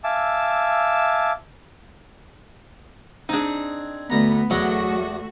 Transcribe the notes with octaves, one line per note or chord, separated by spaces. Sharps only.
E5 F5 G#5 A5 D6 E6
C4 D4 D#4 G#4
D2 B3 A#5
E2 F#3 A3 D4 F#4 D#5